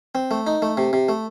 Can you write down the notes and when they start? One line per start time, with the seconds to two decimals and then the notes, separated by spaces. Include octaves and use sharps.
0.15 C4
0.31 A3
0.47 D#4
0.62 A3
0.77 C3
0.93 C3
1.09 A3